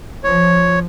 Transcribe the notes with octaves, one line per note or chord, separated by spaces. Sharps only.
F3 C#5